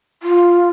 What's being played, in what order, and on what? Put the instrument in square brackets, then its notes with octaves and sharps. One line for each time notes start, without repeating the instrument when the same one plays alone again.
[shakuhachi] F4